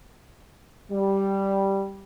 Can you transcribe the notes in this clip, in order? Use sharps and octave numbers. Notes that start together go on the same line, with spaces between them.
G3